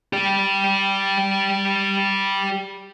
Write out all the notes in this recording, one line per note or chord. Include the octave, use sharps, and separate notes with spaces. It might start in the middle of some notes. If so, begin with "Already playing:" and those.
G4 D5